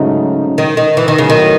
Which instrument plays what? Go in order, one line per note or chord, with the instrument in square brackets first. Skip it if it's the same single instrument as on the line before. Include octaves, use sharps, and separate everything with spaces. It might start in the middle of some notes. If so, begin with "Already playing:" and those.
Already playing: [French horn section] G#2 F#3 A3 D#4 [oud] C#3
[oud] D#3
D#3
E3
D#3
[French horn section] A2 F#3 B3 D#4 [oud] C#3
[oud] D#3